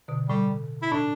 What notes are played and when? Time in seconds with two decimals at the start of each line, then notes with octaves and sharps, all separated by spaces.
0.08 B2 D3
0.29 A2 G3
0.82 E4
0.92 A2 D4